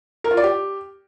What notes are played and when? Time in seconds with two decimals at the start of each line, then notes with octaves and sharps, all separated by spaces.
0.24 A#4
0.31 F4
0.37 D5
0.44 G4